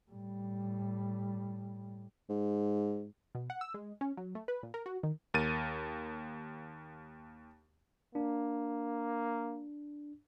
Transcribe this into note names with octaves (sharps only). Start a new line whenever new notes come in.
A2 G3
G#2
B2
F#5
E6
G#3
C#4
F#3
A3
B4
A#2
A#4
F#4
D#3
D#2 A#4 A6 D#7
A#3 D4